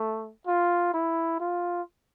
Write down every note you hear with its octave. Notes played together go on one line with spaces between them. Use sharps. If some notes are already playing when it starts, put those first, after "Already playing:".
Already playing: A3
F4
E4
F4